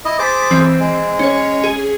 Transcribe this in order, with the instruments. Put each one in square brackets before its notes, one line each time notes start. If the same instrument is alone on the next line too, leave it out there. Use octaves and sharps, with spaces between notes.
[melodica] E4 D#5
[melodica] G#4 C5 D6 [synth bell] A6 B6
[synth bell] E3 C4
[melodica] G#3
[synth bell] C#4 C#5
G#4